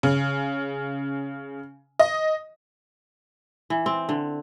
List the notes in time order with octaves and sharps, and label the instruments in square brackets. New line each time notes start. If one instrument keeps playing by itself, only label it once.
[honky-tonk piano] C#3
D#5
[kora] E3
C4
D3